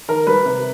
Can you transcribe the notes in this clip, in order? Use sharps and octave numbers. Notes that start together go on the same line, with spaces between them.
D#3 A#4
G3 B4
C3